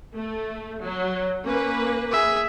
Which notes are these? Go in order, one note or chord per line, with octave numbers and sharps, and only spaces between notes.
A3
F#3
A#3 C#4 B4
G#4 E5